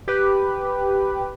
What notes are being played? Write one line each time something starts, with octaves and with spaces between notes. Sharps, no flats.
G4 B4